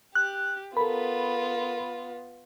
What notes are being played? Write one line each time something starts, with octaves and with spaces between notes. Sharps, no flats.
G4 F#6
B3 F4 A4 A#4 B5